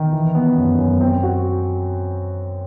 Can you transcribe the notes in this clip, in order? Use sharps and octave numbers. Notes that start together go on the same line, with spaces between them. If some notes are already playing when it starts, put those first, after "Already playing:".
Already playing: D#3
E3
B3
F#2
F#2
C4
F#4